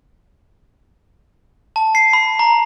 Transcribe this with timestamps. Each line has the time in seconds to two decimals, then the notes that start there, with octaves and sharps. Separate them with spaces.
1.76 A5
1.95 C7
2.13 B5
2.39 A#5